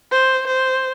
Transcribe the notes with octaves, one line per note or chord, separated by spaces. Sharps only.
C5
C5